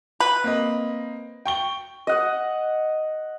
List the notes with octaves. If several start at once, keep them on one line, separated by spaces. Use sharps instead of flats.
B4
A#3 C4 D#5
G5 C#6 G7
D#5 F#5